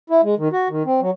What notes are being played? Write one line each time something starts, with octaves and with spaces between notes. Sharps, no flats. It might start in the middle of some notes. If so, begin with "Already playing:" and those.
E4
G#3
D#3
F#4
D#3
C4
F#3